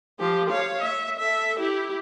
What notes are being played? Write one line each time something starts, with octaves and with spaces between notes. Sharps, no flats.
F3 G4
C#5 F5
E5
A4 E5
E4 G4